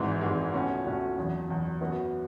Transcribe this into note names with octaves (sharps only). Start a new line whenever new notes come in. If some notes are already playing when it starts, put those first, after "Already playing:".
Already playing: G#1 G#2 E3 G#3
G#1 G#2 E3 G#3
C#2 B2 A3 C#4 F#4
C#2 B2 A3 C#4 F#4
F#1 E2 B2
F#1 E2 B2
F#2 E3 B3 F#4